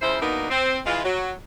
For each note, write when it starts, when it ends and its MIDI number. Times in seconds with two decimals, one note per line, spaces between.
0.02 0.19 49
0.02 0.19 53
0.02 0.19 64
0.02 0.19 72
0.21 0.46 47
0.21 0.46 58
0.21 0.46 59
0.21 0.46 62
0.21 0.46 63
0.21 0.46 70
0.50 0.79 60
0.86 1.02 52
0.86 1.02 56
0.86 1.02 65
1.04 1.31 54